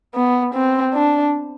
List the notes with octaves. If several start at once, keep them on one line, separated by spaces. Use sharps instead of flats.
B3
C4
D4